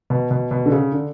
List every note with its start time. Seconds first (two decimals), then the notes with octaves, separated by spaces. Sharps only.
0.10 B2
0.31 B2
0.51 B2
0.66 D3
0.72 C#3
0.92 D3